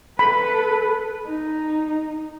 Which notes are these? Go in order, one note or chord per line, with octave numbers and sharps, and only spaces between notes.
A4 B4 B5
D#4